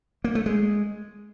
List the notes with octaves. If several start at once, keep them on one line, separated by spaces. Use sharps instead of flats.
A#3
A3
G#3